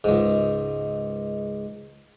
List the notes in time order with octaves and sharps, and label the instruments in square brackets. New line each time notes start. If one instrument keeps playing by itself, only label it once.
[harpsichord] C#2 G#2